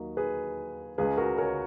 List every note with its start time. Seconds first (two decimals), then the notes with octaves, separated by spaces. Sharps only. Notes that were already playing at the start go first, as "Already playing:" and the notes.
Already playing: D#2 D#3 F#3 A#3 D#5
0.17 G#4 B4
0.98 C#2 C#3 G#3 G#4 B4
1.17 F#4 A#4
1.38 A#4 C#5